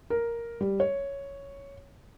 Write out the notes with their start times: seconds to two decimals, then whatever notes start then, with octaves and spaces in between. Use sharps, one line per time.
0.10 A#4
0.61 G3
0.80 C#5